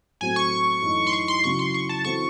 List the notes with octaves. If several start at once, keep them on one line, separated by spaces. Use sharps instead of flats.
A2 F#3 C4 F#4 A4 G#5
C#6
F#2 E3 A3 D#4
C6
C#6
C6
C#3 F#3 C#4 E4 C#6
C6
C#6
A5
E3 C4 F#4 A4 C#6